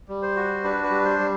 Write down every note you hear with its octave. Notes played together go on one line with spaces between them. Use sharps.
G3
C5
F#4
D4 B4
B4
G3
C5
G3